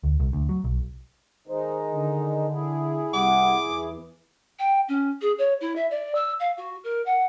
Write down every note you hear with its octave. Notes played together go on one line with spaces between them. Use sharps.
D2
C2
D2
F#3
B1
D#3 G#3 D#4 C5
D3
E4 G#4
C2 G3 F#5 D6
E2 E3
G5
C#4
G#4
C#5
E4
E5
D5
E6
F5
F#4
A#4
F#5